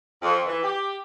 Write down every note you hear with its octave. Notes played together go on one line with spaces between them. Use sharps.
F2
E3
G4